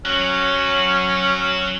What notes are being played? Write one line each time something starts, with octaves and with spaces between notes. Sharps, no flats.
F#3 C#4